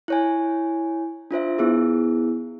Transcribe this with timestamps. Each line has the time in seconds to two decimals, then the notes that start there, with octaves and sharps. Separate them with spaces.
0.08 E4 C#5 G#5
1.31 D4 F4 C5 E5
1.58 B3 E4 G#4